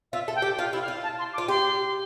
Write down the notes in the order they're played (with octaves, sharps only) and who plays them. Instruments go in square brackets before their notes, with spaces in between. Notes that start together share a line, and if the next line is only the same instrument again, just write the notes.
[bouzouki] F4 [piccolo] E5
[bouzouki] A4
[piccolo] G5
[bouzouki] G4
[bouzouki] F4 [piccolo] F5
[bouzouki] E4
[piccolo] F5
[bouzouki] F4
[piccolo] A5
C6
D6
[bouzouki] F4
[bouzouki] G4 [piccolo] C6